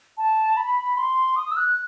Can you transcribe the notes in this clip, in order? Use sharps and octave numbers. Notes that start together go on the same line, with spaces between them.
A5
B5
C6
D#6
E6
F#6